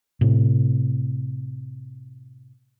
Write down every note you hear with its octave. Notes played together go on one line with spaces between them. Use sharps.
A2 C3